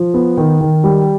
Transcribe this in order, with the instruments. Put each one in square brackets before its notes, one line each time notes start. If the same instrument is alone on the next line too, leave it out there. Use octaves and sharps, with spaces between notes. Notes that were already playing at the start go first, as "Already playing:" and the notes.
Already playing: [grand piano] F3
B3
D#3
D#3
G3